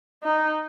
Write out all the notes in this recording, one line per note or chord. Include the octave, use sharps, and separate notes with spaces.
D#4